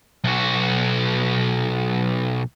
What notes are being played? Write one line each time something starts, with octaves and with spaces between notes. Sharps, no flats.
B1 F#4